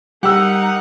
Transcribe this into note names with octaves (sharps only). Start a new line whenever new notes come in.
G3 D#4 G4 A#4 F#5 E6